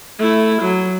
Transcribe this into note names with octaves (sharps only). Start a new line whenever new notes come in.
A3 E4
F#3